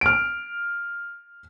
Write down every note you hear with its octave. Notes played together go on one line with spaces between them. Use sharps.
F6 D7